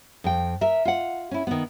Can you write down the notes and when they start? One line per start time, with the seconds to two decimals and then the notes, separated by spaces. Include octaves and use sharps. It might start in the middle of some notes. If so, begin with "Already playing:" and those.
0.24 F2 G5
0.61 A#4 E5
0.85 F4 F#5
1.31 C#4 E4
1.47 D#3 B3